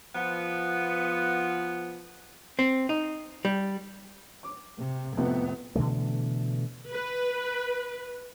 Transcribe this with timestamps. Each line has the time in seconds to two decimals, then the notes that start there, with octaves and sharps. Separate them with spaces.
0.15 F3 B3
2.59 C4
2.89 D#4
3.45 G3
4.43 D6
4.79 C3
5.17 F2 A2 C3 B3
5.75 B2 D3 E3 A3
6.91 B4